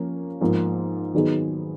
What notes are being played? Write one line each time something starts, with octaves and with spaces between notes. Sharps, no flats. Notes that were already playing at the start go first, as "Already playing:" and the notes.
Already playing: F3 A#3 C#4
G#2 F3 A#3
D#3 F#3 B3 D#4 G#4